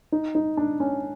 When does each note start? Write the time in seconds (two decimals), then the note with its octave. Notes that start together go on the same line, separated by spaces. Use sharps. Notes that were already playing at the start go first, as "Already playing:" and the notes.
0.12 D#4
0.35 D#4
0.57 D4
0.80 C#4